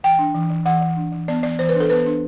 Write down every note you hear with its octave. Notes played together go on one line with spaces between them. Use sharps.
E3 G5
D4
E3
E3
E3 F#5
E3
D4
E3
B3 D5
E3 D5
E3 C5
B4
D4
A4
B3 B4
D4